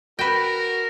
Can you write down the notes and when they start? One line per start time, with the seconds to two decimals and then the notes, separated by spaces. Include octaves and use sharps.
0.19 F#4 A#4 B4 G5 A#6 E7